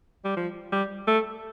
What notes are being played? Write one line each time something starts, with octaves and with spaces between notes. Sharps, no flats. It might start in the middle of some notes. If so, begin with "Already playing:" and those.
G3
F3
G3
A3